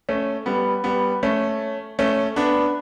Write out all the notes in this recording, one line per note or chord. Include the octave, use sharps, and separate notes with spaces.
A3 C#4
G3 B3
G3 B3
A3 C#4
A3 C#4
B3 D4